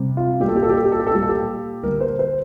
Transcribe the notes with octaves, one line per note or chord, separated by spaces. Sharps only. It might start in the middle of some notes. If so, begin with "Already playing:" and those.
Already playing: C3 G3
F4
A#2 G3 G4
A4
G4
A4
G4
A4
G4
A4
G4
A4
A#2 G3 G4
A4
G4
D3 G3 A#4
C5
C5